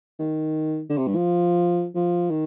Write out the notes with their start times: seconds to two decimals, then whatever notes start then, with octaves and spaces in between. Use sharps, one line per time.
0.19 D#3
0.90 D3
0.98 C3
1.07 G2
1.16 F3
1.95 F3
2.30 D#3